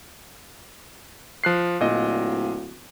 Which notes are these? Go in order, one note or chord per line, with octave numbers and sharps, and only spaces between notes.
F3 F#6 C7
D1 A#2 D#5